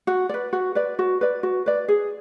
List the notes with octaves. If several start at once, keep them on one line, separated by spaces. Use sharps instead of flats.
F#4
B4 D5
F#4
B4 D5
F#4
B4 D5
F#4
B4 D5
G#4